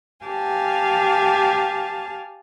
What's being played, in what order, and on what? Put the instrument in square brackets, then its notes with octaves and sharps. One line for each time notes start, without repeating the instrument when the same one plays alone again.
[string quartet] G4 F5 G#5 A5